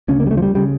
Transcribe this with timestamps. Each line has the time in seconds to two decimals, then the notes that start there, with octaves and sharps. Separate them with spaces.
0.08 D2 C#3 C#4
0.20 A#3
0.26 G3
0.31 A3
0.37 F3
0.42 G3
0.55 C#3 G3